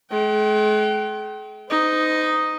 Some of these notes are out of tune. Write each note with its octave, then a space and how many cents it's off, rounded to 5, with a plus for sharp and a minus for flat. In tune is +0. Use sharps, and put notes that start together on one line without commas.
G#3 +40 G5 -30
D#4 +0 C5 -35